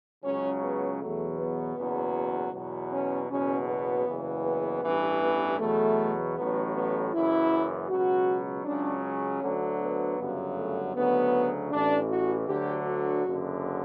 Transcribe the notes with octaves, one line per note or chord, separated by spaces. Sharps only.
C#2 C#3 F#3 C#4
B3
E2 B2 F#3 A3
B3
F#1 E2 B2 F#3
E2 B2 F#3
C#4
F#1 E2 B2 F#3 C#4
B3
F#1 E2 C#3 E3
B3
A1 G2 E3
B3
E2 B2 F#3 A3
A1 A2 F#3 B3
B3
F#1 F#2 E3 E4
C#2 B2 F#3 F#4
C#2 C#3 F#3 D4
C#4
D2 D3 F#3
B3
G1 F#2 C#3 F#3
A3
D2 C#3 F#3 B3
A1 A2 E3 D4
F#4
D2 D3 F#3 G4
F#4
F#1 F#2 D3